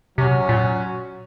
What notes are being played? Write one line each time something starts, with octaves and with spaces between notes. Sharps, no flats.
C3 F#3 C#4 F#4
A#2